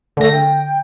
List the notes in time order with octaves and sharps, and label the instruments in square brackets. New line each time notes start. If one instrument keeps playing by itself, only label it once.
[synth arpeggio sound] D3 A#6 [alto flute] A3
[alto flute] G5